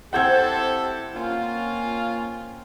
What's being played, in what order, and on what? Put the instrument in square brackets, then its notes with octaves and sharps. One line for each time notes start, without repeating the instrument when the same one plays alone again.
[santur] C4 G5 [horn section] E4 G4 A4 [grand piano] F#5 G6 G#6
[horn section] A#3 C#4 F4